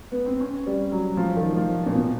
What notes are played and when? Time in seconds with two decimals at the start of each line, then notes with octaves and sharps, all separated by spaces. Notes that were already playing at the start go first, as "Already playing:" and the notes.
0.12 B3
0.26 C4
0.40 C#4
0.67 G3
0.92 F#3
1.17 F3
1.37 D#3
1.56 F3
1.87 A#2
1.95 B2